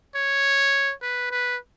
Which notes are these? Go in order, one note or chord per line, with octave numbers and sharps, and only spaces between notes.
C#5
B4
B4